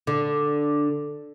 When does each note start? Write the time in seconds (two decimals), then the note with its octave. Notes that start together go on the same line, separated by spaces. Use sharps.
0.07 D3